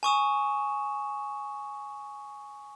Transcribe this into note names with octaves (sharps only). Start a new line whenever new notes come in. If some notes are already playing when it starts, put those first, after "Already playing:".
G#5 C#6 D#6 E7